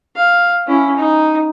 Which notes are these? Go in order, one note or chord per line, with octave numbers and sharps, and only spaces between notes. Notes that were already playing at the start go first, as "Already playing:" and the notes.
F5
C#4 E4
D#4